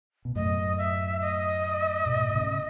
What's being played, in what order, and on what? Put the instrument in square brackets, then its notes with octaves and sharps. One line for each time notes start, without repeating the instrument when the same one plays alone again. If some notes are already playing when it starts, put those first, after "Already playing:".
[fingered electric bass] B2
[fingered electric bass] F#2 A2 [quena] D#5
[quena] E5
D#5
[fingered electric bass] G#2 B2
B2
A2 C#3